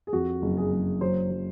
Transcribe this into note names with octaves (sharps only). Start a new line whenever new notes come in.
G#4
F2 F#4
F#1
G#4
F#1
F#3 C5
F#3